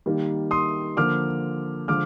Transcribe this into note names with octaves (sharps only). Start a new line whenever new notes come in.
D#3 G3 A#3
C6 D#6
D3 F3 A#3 D6 F6
D3 F3 G#3 D6 F6